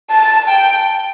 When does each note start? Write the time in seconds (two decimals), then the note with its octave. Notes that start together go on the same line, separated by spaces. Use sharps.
0.10 A5
0.49 G5